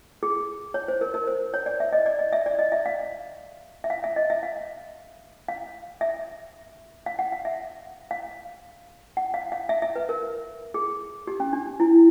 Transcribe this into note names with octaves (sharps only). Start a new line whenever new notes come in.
G#4
C#5
C5
A#4
A#4
C5
C#5
D5
E5
D#5
D5
D#5
E5
D5
D#5
E5
F5
E5
F5
E5
D#5
E5
F5
F5
E5
F5
F#5
F5
E5
F5
F#5
F5
F5
E5
E5
B4
A#4
G#4
G4
C#4
D4
E4